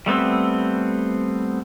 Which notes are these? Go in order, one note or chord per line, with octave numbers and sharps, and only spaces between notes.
G3 A3 B3 C4